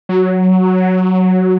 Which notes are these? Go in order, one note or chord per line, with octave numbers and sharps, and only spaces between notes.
F#3